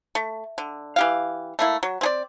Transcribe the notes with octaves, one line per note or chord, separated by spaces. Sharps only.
A3
D3
E3 G4 F5
A3 A#3 E4
F#3
C4 G#4 D5